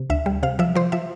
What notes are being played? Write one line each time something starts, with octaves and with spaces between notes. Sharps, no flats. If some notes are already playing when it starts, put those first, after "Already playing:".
Already playing: C3
D2 E5
G3
C3 F5
F3 E5
F3 C5
F3 E5